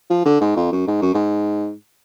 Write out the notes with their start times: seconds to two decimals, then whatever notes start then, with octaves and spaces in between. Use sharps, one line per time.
0.10 F3
0.25 D3
0.41 G#2
0.56 F2
0.72 F#2
0.88 G#2
1.02 F#2
1.15 G#2